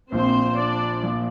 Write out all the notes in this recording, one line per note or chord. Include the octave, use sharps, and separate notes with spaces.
A#1 A#2 F3 C4 C5
D4 D5
A#2 F3